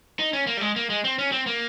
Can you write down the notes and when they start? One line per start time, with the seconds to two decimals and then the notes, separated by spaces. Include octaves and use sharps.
0.19 D#4
0.33 C#4
0.47 A#3
0.57 G3
0.61 G#3
0.76 A#3
0.90 G#3
1.05 C4
1.19 C#4
1.32 C4
1.47 A#3